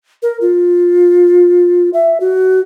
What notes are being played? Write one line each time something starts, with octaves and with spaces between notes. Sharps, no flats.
A#4
F4
E5
F#4